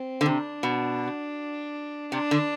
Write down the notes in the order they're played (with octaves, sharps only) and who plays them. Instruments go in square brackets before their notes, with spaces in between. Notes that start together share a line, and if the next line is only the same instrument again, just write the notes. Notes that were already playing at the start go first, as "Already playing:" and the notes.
Already playing: [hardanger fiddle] C4
[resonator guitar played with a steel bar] D3
[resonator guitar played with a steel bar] C3 [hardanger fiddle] D4
[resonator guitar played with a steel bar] B2
[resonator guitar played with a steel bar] C3 [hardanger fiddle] D4
[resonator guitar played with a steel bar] D3